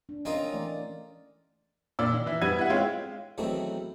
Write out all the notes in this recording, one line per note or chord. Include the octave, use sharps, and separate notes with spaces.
D4
C4 C#4 D#4 F4 A#4
E3 A3 D5
A#2 D5 E6
D#3
E3 E4
G3 B3 B4 G#6 D#7
E4 F#5
G#3 C4 F4 C#5 G5
E2 D#3 F#3 A3 C4